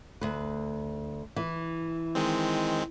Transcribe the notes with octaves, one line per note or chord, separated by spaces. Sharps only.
D2 B4
E3
D#3 G#3 C4